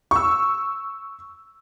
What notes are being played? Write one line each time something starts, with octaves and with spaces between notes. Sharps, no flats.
C#6 E6